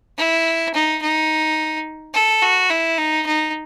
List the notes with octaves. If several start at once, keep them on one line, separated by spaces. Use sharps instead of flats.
E4
D#4
D#4
A4
F#4
E4
D#4
D#4